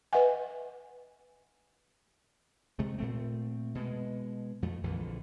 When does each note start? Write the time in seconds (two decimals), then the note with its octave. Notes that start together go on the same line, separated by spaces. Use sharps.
0.13 B4 D#5 E5 F#5 G#5
2.79 C3 G#3 A3
2.98 A#2 A3 C4
3.75 B2 G#3
4.62 F2 F3 A3
4.84 A#1 F2 D3 E3